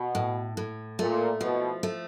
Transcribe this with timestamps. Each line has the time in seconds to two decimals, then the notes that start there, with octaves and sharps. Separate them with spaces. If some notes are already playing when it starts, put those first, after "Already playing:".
Already playing: B2
0.15 A2
0.57 A2
0.99 A#2 A3
1.41 B2 F3
1.83 A3